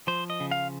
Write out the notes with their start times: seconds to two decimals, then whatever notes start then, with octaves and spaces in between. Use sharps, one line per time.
0.07 F3 C5
0.30 D#5
0.40 C#3
0.51 F5